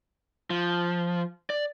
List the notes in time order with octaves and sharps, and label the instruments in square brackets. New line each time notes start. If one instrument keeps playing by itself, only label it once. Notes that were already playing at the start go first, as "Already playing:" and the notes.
[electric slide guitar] F3
D5